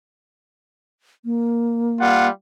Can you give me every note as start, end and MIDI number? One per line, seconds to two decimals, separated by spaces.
1.25 2.29 58
2.01 2.29 55
2.01 2.29 65
2.01 2.29 78